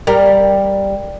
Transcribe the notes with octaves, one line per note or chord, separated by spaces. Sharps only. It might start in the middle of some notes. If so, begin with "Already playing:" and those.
G3 A#4